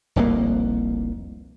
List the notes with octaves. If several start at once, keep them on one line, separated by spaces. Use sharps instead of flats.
F1 C2 B2 A#3